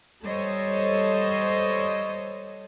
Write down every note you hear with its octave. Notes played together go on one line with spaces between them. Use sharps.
G3 A4 C5 C#5 D#5